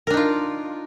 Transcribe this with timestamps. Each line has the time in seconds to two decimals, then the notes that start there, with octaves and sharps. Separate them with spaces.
0.07 A#4
0.10 D4
0.14 D#4
0.17 F4